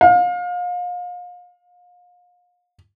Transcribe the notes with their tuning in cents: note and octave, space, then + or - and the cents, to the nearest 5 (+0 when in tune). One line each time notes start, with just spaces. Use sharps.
F5 +35